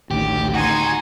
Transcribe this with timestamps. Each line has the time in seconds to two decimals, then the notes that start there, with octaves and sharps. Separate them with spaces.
0.11 A1 D2 D#3 G4
0.54 D#4 F#4 G#5 C6